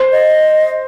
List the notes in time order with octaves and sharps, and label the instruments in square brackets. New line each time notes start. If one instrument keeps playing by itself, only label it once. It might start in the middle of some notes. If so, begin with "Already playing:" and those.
Already playing: [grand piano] C5
[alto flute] D#5